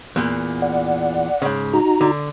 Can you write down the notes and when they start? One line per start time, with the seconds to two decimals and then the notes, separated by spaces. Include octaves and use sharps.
0.16 E2 A#2
0.62 D5 F#5
1.42 G#2 C#3
1.73 D#4 F#4 A#5
2.01 D3